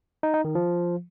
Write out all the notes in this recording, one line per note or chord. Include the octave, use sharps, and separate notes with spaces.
D#4
D#4
D#3
F3